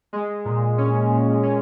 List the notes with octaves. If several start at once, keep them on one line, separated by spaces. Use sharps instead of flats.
G#3
A#2
C#4
A#2
C#4